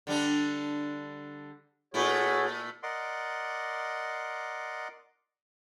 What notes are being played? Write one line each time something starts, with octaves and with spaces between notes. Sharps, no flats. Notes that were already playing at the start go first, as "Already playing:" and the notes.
D3 G3 D4
A#2 A3 E4 F#4 G#4 C#5
A#4 D5 D#5 F#5 C6 D6